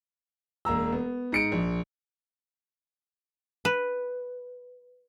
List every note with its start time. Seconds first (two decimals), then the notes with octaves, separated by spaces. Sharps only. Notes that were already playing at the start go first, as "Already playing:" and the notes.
0.65 E1 A#3 A#5 E6
0.92 B3
1.32 G#2 C#7 D7
1.52 A#1
3.65 B4